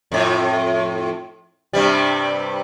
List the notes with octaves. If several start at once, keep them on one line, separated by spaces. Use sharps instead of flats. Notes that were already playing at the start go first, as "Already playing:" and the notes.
F2 A2
G2 C3 G3